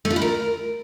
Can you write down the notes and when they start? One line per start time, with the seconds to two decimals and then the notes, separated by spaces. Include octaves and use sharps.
0.05 A3
0.10 F4
0.16 E4
0.22 A#4